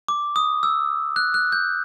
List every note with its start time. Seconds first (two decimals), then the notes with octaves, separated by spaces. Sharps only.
0.08 D6
0.36 D#6
0.63 E6
1.16 F#6
1.34 F#6
1.52 G6